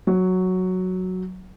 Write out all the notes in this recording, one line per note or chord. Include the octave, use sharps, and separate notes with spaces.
F#3